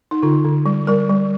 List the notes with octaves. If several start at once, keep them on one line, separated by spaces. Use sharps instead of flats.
D#4
D3 F4
D3
G3
G3 A#4
G3